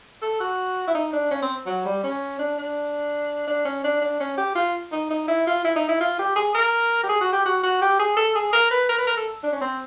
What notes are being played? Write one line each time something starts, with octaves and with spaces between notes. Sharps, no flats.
A4
F#4
E4
D#4
D4
C#4
C4
F#3
G3
C#4
D4
D4
D4
C#4
D4
D4
C#4
G4
F4
D#4
D#4
E4
F4
E4
D#4
E4
F4
G4
G#4
A#4
G4
G#4
F#4
G4
F#4
F#4
G4
G#4
A4
G#4
A#4
B4
A#4
B4
A#4
A4
D4
C#4
C4